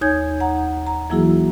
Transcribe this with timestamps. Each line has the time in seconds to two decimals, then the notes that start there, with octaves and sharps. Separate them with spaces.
0.01 D#2 D#4 C#5 G#5 G6 G#6
0.40 F#5 A#5
0.87 A#5
1.10 E3 F#3 A#3 E4 F#4 G#4